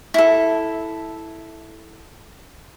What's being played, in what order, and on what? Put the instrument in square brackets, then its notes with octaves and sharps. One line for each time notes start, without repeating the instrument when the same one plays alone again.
[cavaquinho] E4 A4